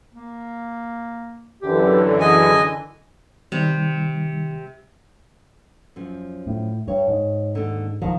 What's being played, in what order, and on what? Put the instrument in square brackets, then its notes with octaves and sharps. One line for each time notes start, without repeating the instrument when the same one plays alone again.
[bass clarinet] A#3
[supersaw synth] F#2 D3 E3 [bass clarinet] G4
[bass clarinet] G#4 [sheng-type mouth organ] D#5 G#5
[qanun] C3 [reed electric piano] D#3 G3
[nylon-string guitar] F#2 F3
[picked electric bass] A2
[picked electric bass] G2 [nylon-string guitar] C#5
[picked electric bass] G#2
[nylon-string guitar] D#2 D3
[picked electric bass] C2 F3 [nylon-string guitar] C3 D#3